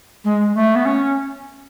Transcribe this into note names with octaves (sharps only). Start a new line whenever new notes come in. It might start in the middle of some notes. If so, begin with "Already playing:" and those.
G#3
A3
B3
C#4